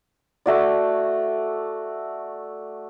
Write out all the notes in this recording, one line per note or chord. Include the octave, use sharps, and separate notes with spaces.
A3 F#4 D5